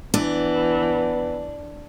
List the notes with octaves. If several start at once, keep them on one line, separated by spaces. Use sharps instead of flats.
E3 B3 D4